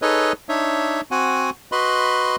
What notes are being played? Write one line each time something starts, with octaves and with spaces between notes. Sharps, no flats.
D#4 G#4 A4 B4 C#5 D#5
D4 D#4 C#5 E5
C4 F#4 F#5 G#5
F#4 B4 D#5 B5 C6